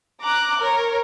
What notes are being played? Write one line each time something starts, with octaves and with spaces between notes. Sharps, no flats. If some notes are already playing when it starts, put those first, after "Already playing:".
A#5 D6 F#6
A#4 C#5